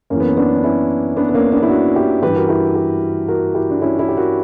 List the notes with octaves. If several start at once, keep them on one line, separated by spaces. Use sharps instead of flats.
F#2 E3 A#3 C#4
B3
C#4
B3 D4
D4
C#4 E4
B3 D4
B3
A#3 C#4
B3 D4
E4
D4 F#4
E4 G4
G2 E3 G4 B4
F#4 A#4
E4 G4
G4 B4
F#4 A#4
E4 G4
D4
C#4 E4
C#4 E4
G4
F#4 A#4